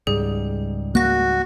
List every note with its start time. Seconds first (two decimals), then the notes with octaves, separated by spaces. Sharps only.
0.07 C#2 G#2 G3 G#4
0.95 A#3 F#4 F#6 A#6